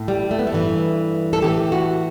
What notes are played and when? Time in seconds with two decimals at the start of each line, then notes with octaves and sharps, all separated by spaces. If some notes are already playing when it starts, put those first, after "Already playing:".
Already playing: A2
0.08 G3
0.31 A3
0.39 B3
0.47 A3
0.52 G2 E3
1.33 A4
1.42 A2 E3 G4
1.72 F#4